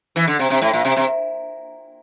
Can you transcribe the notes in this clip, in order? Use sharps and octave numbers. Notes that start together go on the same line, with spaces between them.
E3
D3
C3
C3
A2
A#2
C3
C3